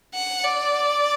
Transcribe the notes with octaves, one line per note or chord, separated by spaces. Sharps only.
F#5
D5